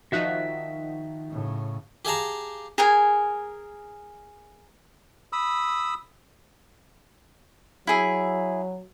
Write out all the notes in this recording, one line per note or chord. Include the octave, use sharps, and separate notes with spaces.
D#3 F3 D#4 F#4 E5 F#6
A2 C#3
G4 G#4 F5 A5 A#5
G#4 A#4 G#5
B5 D#6 E6
F#3 E4 G#4